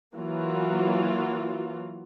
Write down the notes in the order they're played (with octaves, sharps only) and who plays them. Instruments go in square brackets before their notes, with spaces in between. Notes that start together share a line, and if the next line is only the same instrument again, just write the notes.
[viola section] E3 F#3 A#3 F4 F#4